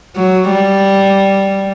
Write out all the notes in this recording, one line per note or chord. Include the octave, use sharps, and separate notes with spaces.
F#3
G3